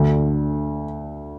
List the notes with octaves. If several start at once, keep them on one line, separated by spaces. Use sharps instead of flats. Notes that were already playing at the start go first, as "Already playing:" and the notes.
Already playing: D2 D3